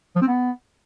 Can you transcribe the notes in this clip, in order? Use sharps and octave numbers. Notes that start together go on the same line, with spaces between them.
F3
C4
B3